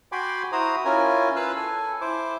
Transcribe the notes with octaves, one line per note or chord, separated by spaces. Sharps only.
F#4 G5 G#5 B5 C6 D6
E4 F#4 C5 A#5 D#6
C#4 E4 F4 A#4 G#5
F4 B4 F5 E6 F#6
A4 G#5
E4 C5 D6